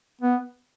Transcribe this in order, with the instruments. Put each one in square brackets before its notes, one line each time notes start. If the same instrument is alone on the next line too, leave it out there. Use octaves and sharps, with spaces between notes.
[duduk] B3